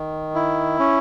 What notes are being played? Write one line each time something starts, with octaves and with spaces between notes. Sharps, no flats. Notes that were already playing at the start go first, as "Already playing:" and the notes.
Already playing: D#3
E4
C#4